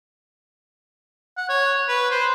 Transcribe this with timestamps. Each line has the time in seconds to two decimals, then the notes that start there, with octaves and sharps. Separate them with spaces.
1.37 F#5
1.49 C#5
1.88 B4
2.11 C5